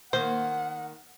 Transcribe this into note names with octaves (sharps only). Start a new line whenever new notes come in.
D#3 A#3 C5 F#5